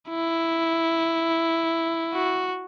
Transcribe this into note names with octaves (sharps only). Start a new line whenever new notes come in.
E4
F#4